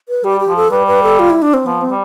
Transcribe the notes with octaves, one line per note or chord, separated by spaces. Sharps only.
B4
G3 G4
G4
F3
A4
G3 B4
B4
A4
F4
E4
D4
C4
F3 B3
C4
G3